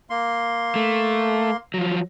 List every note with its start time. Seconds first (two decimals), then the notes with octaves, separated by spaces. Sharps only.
0.10 A#3 C6
0.76 A3
1.74 F3 F#3